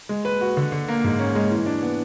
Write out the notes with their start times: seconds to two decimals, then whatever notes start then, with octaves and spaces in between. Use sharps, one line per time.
0.09 G#3
0.25 B4
0.41 F#4
0.57 D3
0.72 D3
0.88 A#3
1.04 G#2
1.19 C#4
1.35 G#3
1.51 E3
1.66 D4
1.82 B3